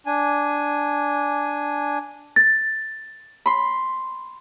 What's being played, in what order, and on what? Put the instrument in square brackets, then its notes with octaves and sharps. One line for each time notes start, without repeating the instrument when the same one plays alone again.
[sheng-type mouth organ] D4 G#5
[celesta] A6
[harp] B5 C6